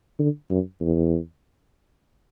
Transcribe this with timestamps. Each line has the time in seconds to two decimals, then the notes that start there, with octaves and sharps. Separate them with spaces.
0.19 D3
0.50 F#2
0.81 E2